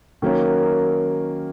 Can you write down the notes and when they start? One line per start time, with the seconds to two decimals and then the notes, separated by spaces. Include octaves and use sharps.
0.22 D#3 F#3 A#3 C#4